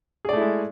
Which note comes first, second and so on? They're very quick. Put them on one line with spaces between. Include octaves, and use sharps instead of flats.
G#4 D5 A3 E4 G#3